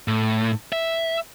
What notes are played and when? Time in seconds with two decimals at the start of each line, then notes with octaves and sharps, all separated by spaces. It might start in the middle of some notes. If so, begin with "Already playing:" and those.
0.08 A2
0.73 E5